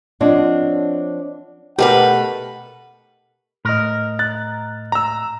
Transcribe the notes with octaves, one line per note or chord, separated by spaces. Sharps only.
F3 C4 D4 C#5 D#5 F#5
B2 A3 G4 A#4 B4 F#5
A2 A#4 D#5
F#6 A6
A#5 E6